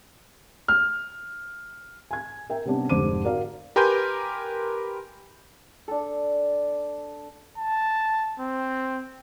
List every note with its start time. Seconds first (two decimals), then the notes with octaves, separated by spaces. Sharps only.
0.68 F6
2.11 G#5 G#6
2.50 A#4 E5 G5
2.65 C3 G3 B3 C#4 D4
2.89 F1 G#2 D3 C5 D6 D#7
3.24 F#4 A#4 D5 F5
3.76 G4 A#4 B4 G#5 C6 G6
5.88 D4 A4
7.58 A5
8.39 C4